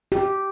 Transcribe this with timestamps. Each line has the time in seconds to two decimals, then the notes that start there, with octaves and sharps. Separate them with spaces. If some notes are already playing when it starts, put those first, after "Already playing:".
0.12 G4